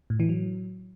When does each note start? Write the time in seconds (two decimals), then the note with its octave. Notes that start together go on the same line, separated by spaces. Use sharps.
0.10 A2
0.20 E3
0.29 F#3